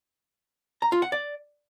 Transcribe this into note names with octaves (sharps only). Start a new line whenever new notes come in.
A#5
F4
F#5
D5